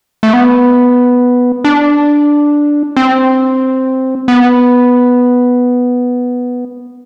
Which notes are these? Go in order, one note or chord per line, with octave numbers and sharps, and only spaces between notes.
A3
B3
D4
C4
B3